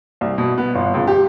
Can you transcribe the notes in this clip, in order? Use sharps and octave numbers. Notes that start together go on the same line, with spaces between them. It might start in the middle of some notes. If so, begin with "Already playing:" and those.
C2
B2
B3
G1
C#2
G4